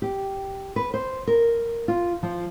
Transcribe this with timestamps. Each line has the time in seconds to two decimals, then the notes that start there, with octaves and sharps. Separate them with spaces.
0.02 G4
0.76 B4
0.94 C5
1.27 A#4
1.88 F4
2.23 F3